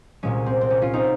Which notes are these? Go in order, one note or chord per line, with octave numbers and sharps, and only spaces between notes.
C2 A#2 G#3 C#4
C4
C4
C#4
C#4 F4
C4 D#4